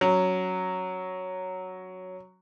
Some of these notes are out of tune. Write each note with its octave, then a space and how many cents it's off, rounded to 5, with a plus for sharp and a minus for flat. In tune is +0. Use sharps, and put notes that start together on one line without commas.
F#3 +0 C#4 +0